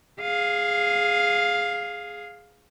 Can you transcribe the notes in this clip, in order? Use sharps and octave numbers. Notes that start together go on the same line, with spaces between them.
G#4 F5